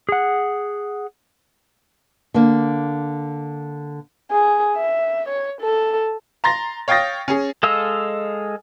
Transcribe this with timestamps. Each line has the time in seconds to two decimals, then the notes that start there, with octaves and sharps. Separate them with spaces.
0.09 G#4 F#5
2.34 D3 A#3
4.32 G#4
4.77 E5
5.29 C#5
5.61 A4
6.44 A#5 C6 A6 A#6
6.88 C#5 F5 G5 D#6 A6 A#6
7.28 C#4 G#4
7.63 G#3 A4 D#5 F5 E6